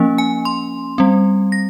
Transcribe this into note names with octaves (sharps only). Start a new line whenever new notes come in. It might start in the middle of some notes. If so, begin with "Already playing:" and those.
Already playing: F3 A#3 C#4
G#5
C6
G3 C4
A#6